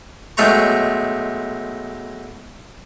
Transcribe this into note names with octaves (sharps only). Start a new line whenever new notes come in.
B1 G#3 A3 C5 A#5 C#6